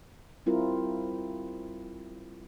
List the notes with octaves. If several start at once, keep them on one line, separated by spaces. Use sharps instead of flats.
G3 C4 E4 F4 A#4